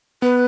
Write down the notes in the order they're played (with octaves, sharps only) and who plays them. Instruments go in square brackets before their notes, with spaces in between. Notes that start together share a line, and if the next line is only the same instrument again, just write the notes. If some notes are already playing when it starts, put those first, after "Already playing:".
[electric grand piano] B3 [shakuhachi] B4